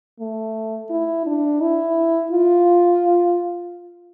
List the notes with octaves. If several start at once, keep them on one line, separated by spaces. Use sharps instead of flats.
A3
E4
D4
E4
F4